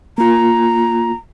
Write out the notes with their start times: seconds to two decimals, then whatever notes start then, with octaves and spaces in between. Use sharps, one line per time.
0.18 A#3 F4 A#5